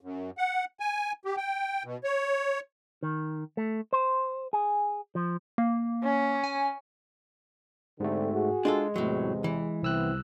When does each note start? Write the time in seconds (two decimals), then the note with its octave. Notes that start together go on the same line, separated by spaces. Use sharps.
0.01 F#2
0.38 F#5
0.80 G#5
1.25 G4
1.37 G5
1.84 B2
2.04 C#5
3.03 D#3
3.57 A3
3.93 C5
4.53 G#4
5.15 F3
5.58 A#3
6.04 C#4
6.44 G#5
8.00 G#2 D3 A3 C4 G4
8.33 F#4 G#4
8.65 G#3 D4 F4 A4
8.96 E2 A2 C3 F#3
9.44 E3
9.83 C2 B3 C4 E4 E6 F#6